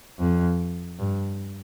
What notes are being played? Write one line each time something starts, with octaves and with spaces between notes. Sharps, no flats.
F2
G2